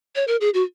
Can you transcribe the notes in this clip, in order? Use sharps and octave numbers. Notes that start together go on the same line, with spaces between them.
C#5
A#4
G#4
F#4